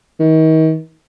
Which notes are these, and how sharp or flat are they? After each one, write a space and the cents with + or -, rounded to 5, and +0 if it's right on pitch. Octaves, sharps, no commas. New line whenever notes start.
D#3 +35